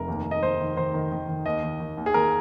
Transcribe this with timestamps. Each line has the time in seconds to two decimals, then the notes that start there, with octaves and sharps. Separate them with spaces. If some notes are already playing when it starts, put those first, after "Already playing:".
Already playing: F1 A#4
0.08 D#2
0.25 D#2
0.31 D#5
0.43 D#3 C5
0.60 D#3
0.77 D#3 C5
0.94 D#3
1.12 D#3
1.28 D#3
1.45 D#2 D#5
1.63 D#3
1.80 D#3
1.97 D#2
2.06 G#4
2.14 D#2 A#4